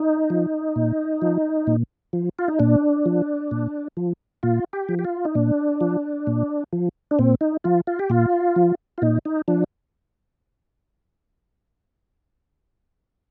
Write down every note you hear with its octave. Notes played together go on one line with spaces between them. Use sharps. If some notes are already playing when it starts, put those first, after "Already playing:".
Already playing: D#4
F3
A#2
F3
A#2
F3
F4
D#4
A#2 D4
F3
A#2
F3
A#2 F4
G4
F3
G4
F4
D#4
A#2 D4
F3
A#2
F3
D4
A#2 C4
D#4
F3 F4
F4
G4
A#2 F4
F3
F4
A#2 D#4
D#4
F3 D4